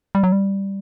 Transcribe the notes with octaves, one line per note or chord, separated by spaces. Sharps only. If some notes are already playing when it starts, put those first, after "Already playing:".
G3
F#3
G3